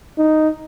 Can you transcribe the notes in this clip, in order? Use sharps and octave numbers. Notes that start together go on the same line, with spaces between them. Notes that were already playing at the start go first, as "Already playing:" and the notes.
D#4